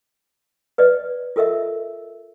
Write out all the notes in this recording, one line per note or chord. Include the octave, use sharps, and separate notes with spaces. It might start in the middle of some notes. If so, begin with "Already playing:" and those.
B4 D5 D#5
F4 A4 A#4 D#5 E5